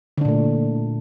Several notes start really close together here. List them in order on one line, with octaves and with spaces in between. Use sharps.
D3 D4 A#2 A3